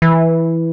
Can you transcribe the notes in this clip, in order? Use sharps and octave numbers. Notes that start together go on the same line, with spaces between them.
E3